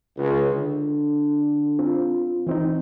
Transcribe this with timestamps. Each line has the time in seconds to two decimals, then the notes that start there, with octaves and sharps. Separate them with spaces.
0.18 C#2
0.50 D3
1.79 C4 F4
2.47 E3 C4 D#4